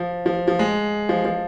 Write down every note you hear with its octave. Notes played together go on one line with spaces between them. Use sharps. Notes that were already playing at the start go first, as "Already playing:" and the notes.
Already playing: F3
F3
F3
G#3
F3
F3